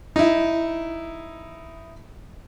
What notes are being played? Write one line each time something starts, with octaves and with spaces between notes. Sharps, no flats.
D#4 E4